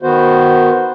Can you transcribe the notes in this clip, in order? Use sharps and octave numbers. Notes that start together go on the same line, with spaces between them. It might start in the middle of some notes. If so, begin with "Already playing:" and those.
D#3 B3 F#4 C5